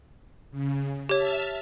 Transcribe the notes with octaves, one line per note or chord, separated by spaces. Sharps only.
C#3
G4 C#5 E5 A5 F6